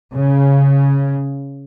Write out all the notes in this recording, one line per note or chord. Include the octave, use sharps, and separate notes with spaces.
C#3